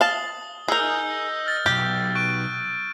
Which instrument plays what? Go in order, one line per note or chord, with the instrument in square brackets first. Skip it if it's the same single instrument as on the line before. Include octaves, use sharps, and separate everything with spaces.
[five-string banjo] F5 A5 [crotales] D#6 F#7 G7
[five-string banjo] G#4 A#4 [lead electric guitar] D#5 A#5 [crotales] D#6 E6 G6
[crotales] F6 A6
[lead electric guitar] B1 G2 [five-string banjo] G4
[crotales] C#6 F#6 D7